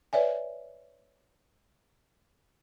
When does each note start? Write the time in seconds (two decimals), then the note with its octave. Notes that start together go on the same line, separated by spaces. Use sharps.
0.13 B4 C#5 D5 E5 G#5